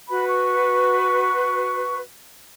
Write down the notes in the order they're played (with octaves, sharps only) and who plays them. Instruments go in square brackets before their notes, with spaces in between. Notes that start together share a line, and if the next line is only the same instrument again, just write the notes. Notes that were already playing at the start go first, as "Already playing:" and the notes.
[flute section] F#4 B4 [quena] B5
[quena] C#6